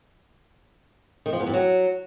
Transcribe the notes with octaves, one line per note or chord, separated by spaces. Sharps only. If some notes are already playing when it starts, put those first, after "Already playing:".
D#3
F3
E2
G2
F#3